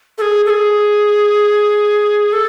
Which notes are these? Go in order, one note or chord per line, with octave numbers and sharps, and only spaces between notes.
A4
G#4
A4
G#4
A4